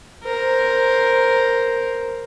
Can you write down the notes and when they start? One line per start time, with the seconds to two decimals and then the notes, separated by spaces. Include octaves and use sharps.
0.24 A#4 C5